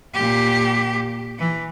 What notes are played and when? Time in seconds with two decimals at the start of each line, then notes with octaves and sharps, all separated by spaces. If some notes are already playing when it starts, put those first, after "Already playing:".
0.14 A#2 G4
1.38 E3